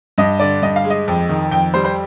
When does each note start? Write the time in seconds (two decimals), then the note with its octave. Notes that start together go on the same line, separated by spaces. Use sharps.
0.18 G2 D#5
0.39 D3 D5
0.62 G2 D#5
0.76 F5
0.84 G#3
0.90 D#5
1.08 F2
1.29 D#3
1.51 F2 G5
1.74 G3 C5
1.85 C5